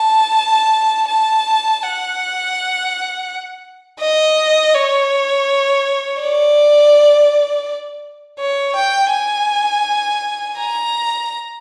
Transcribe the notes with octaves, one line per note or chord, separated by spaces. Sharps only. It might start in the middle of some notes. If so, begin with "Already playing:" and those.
Already playing: A5
A5
F#5
D#5
C#5
D5
C#5
G5
G#5
A#5